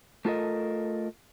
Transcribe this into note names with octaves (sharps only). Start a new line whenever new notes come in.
A3 F4 A4 A#4 D#5